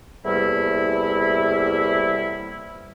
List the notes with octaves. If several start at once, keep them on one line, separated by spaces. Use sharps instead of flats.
E2 A2 C3 G3 A#3 E4